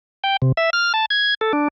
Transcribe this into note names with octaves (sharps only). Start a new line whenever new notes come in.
G5
C3
E5
F6
A5
G#6
A4
D4